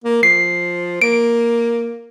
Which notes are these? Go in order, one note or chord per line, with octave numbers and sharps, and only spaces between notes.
A#3
F3 C7
A#3 D7